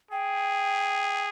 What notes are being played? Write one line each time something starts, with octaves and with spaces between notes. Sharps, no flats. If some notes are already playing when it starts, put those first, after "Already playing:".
G#4 G5